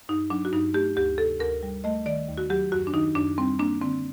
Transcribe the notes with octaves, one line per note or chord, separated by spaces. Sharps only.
G2 D#4
F#3 D4
F#4
G2 D#4
A3 G4
D2 G4
C3 A4
D2 A#4
G3
A3 D#5
D#3 D5
D#2
F#4
F#3 G4
F#2 F#4
D4
D#3 D#4
F#2 D4
G3 C4
A#3 D4
D3 C4